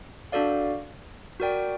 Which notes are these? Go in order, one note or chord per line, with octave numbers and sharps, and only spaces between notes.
D4 F#4 A4 D5 F5
F#4 A#4 D5 G5